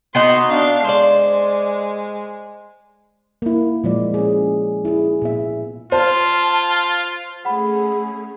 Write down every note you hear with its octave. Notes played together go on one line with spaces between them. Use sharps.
B3 D#4 F#4 C6
D4 F5
G#3 C5 D5
A#3 E4
A#2 F3 G#3 D5
C#4 G#4
E4 G#4
A#2 B3 E5
F4 C5 A5
A3 C#4 G#4 F#5 B5